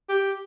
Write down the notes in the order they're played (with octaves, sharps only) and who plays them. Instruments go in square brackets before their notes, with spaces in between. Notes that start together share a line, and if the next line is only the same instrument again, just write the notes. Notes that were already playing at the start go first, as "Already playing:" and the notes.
[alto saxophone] G4